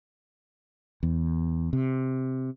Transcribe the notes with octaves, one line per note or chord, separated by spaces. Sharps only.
E2
C3